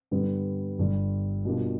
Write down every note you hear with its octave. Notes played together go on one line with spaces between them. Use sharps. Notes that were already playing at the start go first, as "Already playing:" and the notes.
G2 D3 G3 B3
G1 G2 D3 G3
B2 G3 A#3 D4 F4